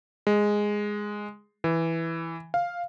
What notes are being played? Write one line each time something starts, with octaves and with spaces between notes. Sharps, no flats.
G#3
E3
F5